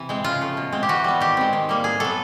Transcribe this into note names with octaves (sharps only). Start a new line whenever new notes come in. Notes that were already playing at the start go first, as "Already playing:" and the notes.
Already playing: C3 E3
G#3 C4
C#3 F4
F3 A3
B2
G#3 C4
G4
E3 F#4
G3 B3
D#3 G4
G#3 C4
D#3
G3 A#3
A2 G#4
F#3 B3 A4